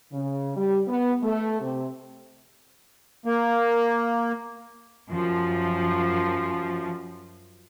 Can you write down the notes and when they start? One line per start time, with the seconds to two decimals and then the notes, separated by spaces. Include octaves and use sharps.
0.13 C#3
0.56 G3
0.88 B3
1.23 A3
1.61 C3
3.26 A#3
5.09 F#2 F3